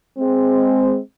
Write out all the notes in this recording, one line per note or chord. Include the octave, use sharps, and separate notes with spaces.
G#3 C4